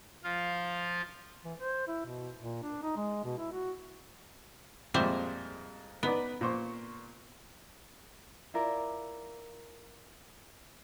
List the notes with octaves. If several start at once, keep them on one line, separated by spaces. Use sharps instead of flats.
F3 F4 F5
E3
C5
E4
B2
A#2
D4
D#4
G#3
B2
E4
F#4
F2 A#2 G3 G#3 C5 E5
B3 D#4 B4 D5
A#2 C5 C#6
E4 F4 A#4 D5